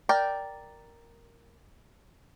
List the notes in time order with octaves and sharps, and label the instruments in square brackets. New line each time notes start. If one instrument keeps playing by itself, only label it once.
[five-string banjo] A#4 D5 G5